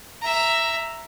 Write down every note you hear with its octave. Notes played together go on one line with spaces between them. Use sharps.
E5 A#5